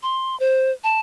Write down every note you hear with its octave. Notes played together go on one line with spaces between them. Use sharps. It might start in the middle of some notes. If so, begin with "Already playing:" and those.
C6
C5
A5